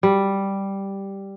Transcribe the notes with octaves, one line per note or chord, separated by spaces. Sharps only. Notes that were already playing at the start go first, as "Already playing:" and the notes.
G3